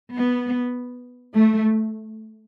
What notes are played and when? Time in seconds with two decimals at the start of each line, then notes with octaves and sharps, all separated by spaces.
0.14 B3
1.36 A3